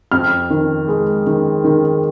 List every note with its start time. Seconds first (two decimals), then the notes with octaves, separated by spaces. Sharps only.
0.12 F2 F6
0.50 D#3
0.88 G#3
1.27 D#3
1.64 D#3